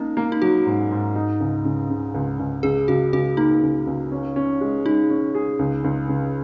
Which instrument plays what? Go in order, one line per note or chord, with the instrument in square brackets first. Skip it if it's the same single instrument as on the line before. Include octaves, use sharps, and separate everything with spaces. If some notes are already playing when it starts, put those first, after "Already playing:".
Already playing: [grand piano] A#3 D#4 [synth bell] C#4
[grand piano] A#3
[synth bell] D#4
[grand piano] F#3 [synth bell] F#4
[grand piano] G#2
G#2
D#4
C#2
C#3
C#3
C#2
C#2
[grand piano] C#2 [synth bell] G#4
[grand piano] C#2 [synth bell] F#4
[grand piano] C#2 [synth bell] F#4
[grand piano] A#3 [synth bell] D#4
[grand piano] C#2
C#2
C#4
C#4
G#3
[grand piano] G#3 [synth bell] D#4
[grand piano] C#4
G#4
C#2
C#2
C#3